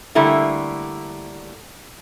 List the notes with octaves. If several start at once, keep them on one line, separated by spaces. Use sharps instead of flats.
D3 G3 A3 A#3 E4